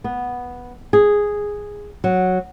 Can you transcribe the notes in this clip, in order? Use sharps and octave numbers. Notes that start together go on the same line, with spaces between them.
B3
G#4
F#3